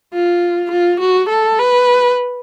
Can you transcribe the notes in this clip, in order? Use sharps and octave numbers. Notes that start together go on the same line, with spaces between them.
F4
F4
F#4
A4
B4